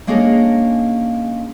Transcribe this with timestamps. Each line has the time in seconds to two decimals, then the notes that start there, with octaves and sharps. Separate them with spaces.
0.07 G#3 A#3 C#4 D4 G#4 A#4